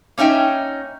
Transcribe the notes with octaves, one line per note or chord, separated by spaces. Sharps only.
A#3 C#4 D#4 E5 G5